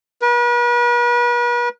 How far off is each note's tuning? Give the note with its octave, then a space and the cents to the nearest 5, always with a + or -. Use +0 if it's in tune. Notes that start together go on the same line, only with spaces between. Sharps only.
B4 -40